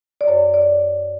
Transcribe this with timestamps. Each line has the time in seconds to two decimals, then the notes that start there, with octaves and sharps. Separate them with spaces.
0.21 D5
0.27 F#2 C#5
0.54 D5